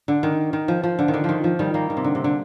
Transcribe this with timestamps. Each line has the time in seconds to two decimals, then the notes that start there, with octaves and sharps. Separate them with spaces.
0.08 D3
0.23 D#3
0.53 D#3
0.68 F3
0.83 F3
0.99 D3
1.08 D#3
1.14 D3
1.24 D#3 F3
1.44 F3
1.59 D#3 G3
1.74 G3 A#3
1.90 D#3
1.97 C3
2.04 D3
2.15 C3
2.24 D3